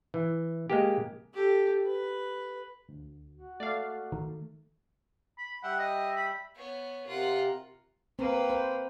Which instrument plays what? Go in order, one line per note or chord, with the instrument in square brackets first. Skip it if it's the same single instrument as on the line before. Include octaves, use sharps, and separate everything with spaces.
[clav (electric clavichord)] E3
G#3 A#3 G4
[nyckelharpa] G4 A4
B4
[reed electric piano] D2
[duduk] F#4
[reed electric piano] A3 [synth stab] D5 F5
[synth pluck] D#3
[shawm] B5
[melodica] G3 E5 G5 [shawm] F#5
[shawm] D#5
B5
[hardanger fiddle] B3 C#5
[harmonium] C3 A#4 [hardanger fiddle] F4 F#5
[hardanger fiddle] A#3 B4 [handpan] C4
[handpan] C5